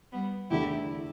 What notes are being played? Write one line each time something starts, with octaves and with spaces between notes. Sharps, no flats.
G3 B3
E2 D3 A3 E4 G4